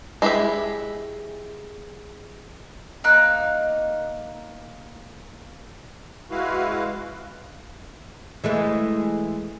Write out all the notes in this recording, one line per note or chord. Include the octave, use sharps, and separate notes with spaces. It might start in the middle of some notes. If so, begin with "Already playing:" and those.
G#3 E4 G4 B4 E5
A#3 D#4 F#6
G#3 E4 F#4 B4 F5
E3 G#3 A3